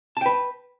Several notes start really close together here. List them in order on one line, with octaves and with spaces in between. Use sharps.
A5 G5 B4